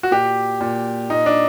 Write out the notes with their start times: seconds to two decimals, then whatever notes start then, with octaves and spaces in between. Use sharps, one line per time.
0.03 F#4
0.11 A#2 G4
0.61 A#2
1.10 A#2 D#4
1.26 D4